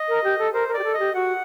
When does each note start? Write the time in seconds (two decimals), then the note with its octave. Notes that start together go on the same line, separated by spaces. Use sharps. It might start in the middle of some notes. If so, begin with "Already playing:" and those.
Already playing: D#5
0.09 A#4
0.24 G4
0.38 A4
0.53 A#4 C5
0.68 A#4
0.74 G4 D5
0.84 A4
0.94 D#5
0.99 G4
1.14 F#4 F#5